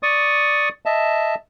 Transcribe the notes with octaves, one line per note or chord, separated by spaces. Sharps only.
D5 C#6 D#6
D#5 E5 A5